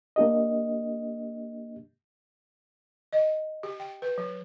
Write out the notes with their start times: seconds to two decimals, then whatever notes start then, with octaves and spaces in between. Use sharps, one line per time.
0.16 A#3 D4 G4 D#5
3.13 D#5
3.63 G4
3.80 G5
4.02 B4
4.18 F#3